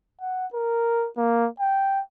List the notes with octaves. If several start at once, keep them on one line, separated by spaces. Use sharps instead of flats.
F#5
A#4
A#3
G5